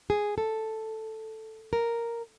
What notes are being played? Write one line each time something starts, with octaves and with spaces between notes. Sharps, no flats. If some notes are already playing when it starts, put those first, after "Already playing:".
G#4
A4
A#4